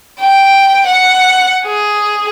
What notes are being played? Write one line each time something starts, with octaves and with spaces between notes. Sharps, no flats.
G5
F#5
G#4